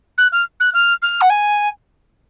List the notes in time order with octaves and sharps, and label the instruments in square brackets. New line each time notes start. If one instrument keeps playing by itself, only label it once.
[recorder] F#6
F6
F#6
F6
F6
F#5
G#5